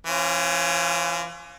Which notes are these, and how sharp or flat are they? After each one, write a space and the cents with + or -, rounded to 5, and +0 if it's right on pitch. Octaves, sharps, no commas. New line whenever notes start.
E3 +35 C#4 -20 F4 +0